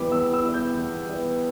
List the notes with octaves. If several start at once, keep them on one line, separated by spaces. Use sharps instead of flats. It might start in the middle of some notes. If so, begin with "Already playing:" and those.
Already playing: E2 E3 G3 B3 B5 D6
E2 E6
E6
E3 G3 B3
G6
E2
E3 G3 B3